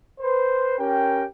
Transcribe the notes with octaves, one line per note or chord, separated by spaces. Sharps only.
B4 C5
C#4 G4 A#4 G5